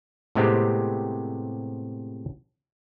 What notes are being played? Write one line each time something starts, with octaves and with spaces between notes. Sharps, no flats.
A2 C3 G#3 B3 C4 G4